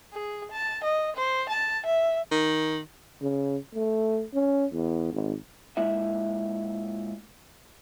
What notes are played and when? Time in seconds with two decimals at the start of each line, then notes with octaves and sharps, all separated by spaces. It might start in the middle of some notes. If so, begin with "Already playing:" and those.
0.12 G#4
0.51 A5
0.83 D#5
1.16 C5
1.49 A5
1.86 E5
2.31 D#3
3.22 C#3
3.74 A3
4.34 C#4
4.72 E2
5.12 G#1
5.77 A#2 G#3 E4 E5